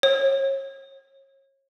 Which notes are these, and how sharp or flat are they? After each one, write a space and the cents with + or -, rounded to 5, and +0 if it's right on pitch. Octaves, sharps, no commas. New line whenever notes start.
C#5 -35